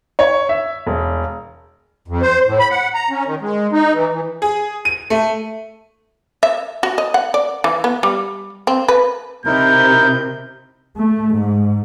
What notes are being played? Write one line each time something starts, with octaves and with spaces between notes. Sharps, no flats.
C#5
E5
E1
F2
C5
A2
B5
F#5
A#5
C#4
D#3
G#3
D#4
E3
E3
G#4
D#7
A3
E5
F#4
D#5
F#5
D5
E3
B3
G3
C4
B4
C3 D#4 E4 A#4 G6
A3
G#2